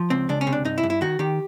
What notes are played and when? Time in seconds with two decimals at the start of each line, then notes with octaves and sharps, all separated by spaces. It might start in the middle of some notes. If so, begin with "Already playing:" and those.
Already playing: F3
0.10 C#2 C4
0.29 C#2 D4
0.41 C#4
0.47 C3
0.53 D4
0.65 G2 D#4
0.78 E4
0.83 G2
0.90 E4
1.01 D#3 F#4
1.19 D#3 G4